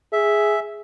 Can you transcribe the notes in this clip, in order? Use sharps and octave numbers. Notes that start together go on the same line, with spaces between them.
G#4 E5